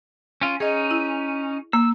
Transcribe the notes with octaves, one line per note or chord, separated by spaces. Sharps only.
C#4 F4
C#4 D#4 G#4 D#5
E4
A#3 E6